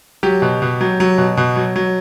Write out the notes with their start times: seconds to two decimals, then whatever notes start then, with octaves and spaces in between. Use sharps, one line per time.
0.23 F#3 G4
0.42 B2
0.62 B2
0.81 F#3
1.00 F#3
1.18 B2
1.37 B2
1.56 F#3
1.76 F#3